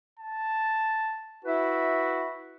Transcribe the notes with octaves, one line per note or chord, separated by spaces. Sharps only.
A5
E4 F#4 B4 E5